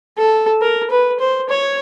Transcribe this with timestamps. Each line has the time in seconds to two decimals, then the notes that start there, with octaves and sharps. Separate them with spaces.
0.18 A4
0.62 A#4
0.91 B4
1.20 C5
1.49 C#5